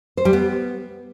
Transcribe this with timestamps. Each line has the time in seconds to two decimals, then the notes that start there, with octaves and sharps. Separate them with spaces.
0.17 C5
0.25 G3
0.33 B3